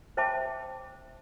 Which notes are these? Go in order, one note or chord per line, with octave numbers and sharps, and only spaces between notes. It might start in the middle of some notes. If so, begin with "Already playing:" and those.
C5 E5 G5 A5 B5 D6